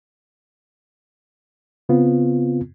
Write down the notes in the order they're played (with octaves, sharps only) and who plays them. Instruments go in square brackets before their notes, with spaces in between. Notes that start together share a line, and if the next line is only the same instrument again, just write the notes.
[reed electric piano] C#3 B3 C4 F4